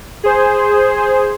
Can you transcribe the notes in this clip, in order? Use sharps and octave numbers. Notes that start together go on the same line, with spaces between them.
G#4 C5